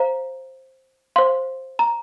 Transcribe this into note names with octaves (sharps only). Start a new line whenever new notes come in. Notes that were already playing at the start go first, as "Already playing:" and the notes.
Already playing: C5 F5 A#5
C5 F5 C6
A#5